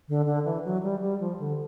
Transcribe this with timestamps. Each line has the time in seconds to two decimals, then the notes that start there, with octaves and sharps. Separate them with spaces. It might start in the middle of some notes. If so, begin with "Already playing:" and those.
0.08 D3
0.26 D3
0.45 E3
0.65 F#3
0.83 G3
1.02 G3
1.20 F3
1.39 D3